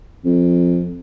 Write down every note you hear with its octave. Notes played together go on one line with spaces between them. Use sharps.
F2